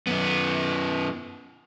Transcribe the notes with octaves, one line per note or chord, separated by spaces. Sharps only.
F#2 B3